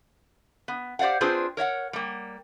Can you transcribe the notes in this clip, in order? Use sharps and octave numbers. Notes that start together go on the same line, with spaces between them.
B3
G4 C5 D5 F5 F#5
C4 D4 F4 G#4 B4 C5
A#4 C#5 E5 F#5
G3 A#3